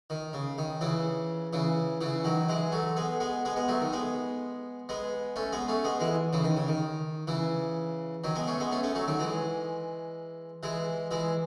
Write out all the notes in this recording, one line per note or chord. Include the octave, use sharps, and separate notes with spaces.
D#3
C#3
D#3
C#3 E3
C#3 E3
C#3 E3
D#3 F#3
E3 G#3
F#3 A3
G#3 B3
G#3 B3
G#3 B3
G#3 B3
F#3 A3
D#3
G#3 B3
G#3 B3
A3 C#4
G#3 B3
A3 C#4
G#3 B3
E3 G#3
C#3 E3
D#3
C#3
D#3
C#3 E3
D#3 F#3
G#3 B3
A3 C#4
G#3 B3
A3 C#4
A3 C#4
F#3 A3
D#3 F#3
E3 G#3
E3 G#3
E3 G#3